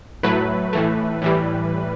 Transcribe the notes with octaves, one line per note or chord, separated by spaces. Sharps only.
A2 F#3 A3 B4
A2 E3 A3
A2 E3 G3